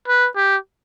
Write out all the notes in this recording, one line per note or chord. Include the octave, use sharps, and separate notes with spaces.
B4
G4